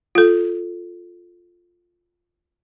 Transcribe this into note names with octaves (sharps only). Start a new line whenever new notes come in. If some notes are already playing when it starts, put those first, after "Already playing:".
F4 A4